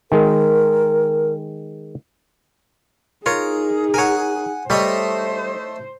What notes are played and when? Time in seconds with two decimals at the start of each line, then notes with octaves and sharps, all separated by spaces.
0.12 D#3 G#3 A#4
3.26 D#4 F4 G#4 A#4 C#5
3.94 A#4 C#5 F#5 G#5
4.70 G3 A3 C5 C#5 D#5